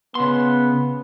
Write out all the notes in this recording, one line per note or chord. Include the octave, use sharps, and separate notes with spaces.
C#3 B3 C6